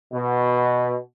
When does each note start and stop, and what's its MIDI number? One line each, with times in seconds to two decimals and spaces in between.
0.13 0.96 47